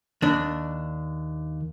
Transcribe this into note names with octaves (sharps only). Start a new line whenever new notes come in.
D#2 D4